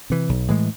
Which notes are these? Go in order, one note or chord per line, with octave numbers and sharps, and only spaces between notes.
C3 E3
B1
A2 E3 G#3